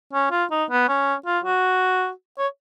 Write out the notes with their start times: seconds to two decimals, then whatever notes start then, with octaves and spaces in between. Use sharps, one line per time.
0.14 C#4
0.31 F4
0.51 D#4
0.70 B3
0.88 C#4
1.26 F4
1.44 F#4
2.38 C#5